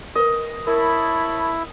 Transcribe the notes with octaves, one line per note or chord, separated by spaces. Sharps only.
A#4 B4 D#5
E4 A#4 C#5 A5 B5